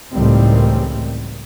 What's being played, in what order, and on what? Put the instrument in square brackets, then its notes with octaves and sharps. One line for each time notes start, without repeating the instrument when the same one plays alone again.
[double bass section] C#2 A2 D#3 E3 G3 C4